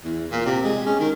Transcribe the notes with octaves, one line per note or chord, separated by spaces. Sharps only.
E2
A#2
C3
G#3
C#4
D#3